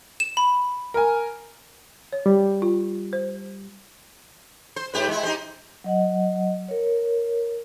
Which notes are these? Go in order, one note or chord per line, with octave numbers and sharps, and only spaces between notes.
E7
B5
A#4 G#5
C#5
G3
F4
C5
C5
G#2 G4 B4
G#3 E4
D#4 G4 C5
F#3 D#5 F#5
A#4 C#5